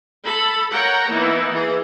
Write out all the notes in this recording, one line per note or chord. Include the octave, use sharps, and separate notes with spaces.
A4 B5
A#4 C#5 F#5 G5 A#5
E3 A#3 B3 D#4 E4
E3 G#4